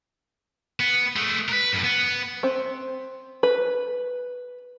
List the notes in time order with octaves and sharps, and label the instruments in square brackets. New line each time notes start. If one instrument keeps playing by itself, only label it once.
[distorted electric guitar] B3
G#3 A3
A#4 B4
F#2 A2
B3
[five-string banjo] C4
B4